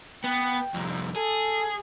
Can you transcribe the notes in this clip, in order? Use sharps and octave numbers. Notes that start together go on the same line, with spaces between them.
B3 G5
C2 F2
G#4 A4